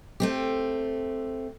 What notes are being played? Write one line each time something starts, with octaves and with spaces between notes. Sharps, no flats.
A3 C4 G4